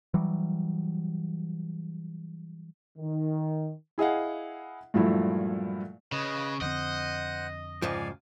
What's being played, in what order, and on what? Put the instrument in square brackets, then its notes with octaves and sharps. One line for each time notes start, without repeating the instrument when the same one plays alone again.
[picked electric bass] E3 F#3 G3
[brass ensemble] D#3
[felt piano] E4 G#4 D#5 F5 F#5
G2 A#2 F3 F#3 A3 E4
[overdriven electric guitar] C#3 [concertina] B4 D#5
[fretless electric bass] F2 D3 C4 [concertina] C5 F#5 F#6 [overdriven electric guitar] D#5
[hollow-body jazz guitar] C#2 G#2 F3 [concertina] D5 F5 G#5